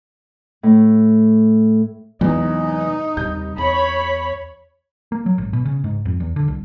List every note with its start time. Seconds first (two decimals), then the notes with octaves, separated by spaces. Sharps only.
0.63 A2
2.21 E2 C3 F#3 G#3 D#4
3.17 D#2 C3 G3 G6
3.58 E2 C#5 B5
5.12 A#3
5.26 F#3
5.38 G#1
5.53 B2
5.65 C#3
5.84 G#2
6.05 F2
6.20 E2
6.36 D3
6.48 C2